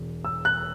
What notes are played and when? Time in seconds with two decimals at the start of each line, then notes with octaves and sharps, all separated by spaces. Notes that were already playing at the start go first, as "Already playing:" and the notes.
Already playing: E1
0.25 E6
0.45 F#6